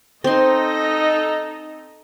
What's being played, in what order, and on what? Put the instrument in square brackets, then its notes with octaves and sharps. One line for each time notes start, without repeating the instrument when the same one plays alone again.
[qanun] C4 C6 [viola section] D#4 A4 D#5